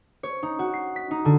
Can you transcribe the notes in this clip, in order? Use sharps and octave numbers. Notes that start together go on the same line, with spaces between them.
C#5
D#4
F#4
C7
B6
D#4
D3